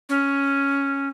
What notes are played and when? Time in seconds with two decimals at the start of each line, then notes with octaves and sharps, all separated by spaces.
0.09 C#4